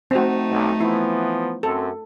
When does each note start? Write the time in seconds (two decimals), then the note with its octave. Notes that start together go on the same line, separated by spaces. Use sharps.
0.11 A3 C4 D#4 F#4
0.51 B1
0.80 E3 F3 B3 E4
1.63 F#2 C4 A4